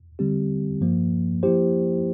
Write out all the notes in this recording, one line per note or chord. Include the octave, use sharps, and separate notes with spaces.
D3 G3 C4 G4
G2 F3 A#3
F3 A#3 E4 G4 C5